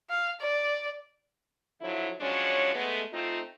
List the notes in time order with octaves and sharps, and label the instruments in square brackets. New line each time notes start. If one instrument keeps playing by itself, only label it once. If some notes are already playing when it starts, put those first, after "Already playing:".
[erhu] F5
D5
[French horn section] D3 F3 F#3 E4
F3 F#3 G#3 C#4 D4 C#5
G#3 A3 B3
A3 C4 D#4 F4